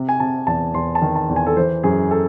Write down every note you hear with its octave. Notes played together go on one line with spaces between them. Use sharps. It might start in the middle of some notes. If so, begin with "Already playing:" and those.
Already playing: C3
G#5
C3 A5
E2 A5
E2 C6
A5
D#3
A5
E2
G#5
A4
E3 C5
F#2 G#4
A4